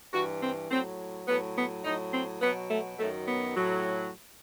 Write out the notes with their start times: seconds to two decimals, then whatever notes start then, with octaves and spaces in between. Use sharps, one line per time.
0.13 G2 E3 F#4
0.42 C4
0.70 A2 F#3 C4
1.27 A2 F#3 B3
1.56 B3
1.84 A2 F#3 D#4
2.12 C4
2.41 B2 F#3 B3
2.69 A3
2.98 F#2 D#3 F#3 A3
3.27 B3
3.56 A2 F#3